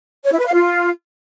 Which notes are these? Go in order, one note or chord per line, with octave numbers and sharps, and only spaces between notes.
C#5
E4
B4
F5
F4